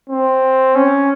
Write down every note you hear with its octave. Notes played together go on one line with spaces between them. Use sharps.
C4
C#4